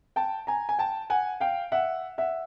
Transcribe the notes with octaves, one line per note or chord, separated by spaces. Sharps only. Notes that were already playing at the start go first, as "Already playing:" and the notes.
G5 A5
G#5 A#5
G#5
G5 A5
F#5 G#5
F5 G5
E5 F#5
E5 F#5